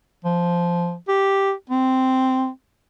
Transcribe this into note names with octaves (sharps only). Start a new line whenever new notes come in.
F3
G4
C4